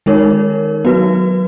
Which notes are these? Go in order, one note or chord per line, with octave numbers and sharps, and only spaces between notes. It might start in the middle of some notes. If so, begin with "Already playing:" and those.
D#3 G#3 D#4 A#4 C#5
F#3 B3 F#4 B4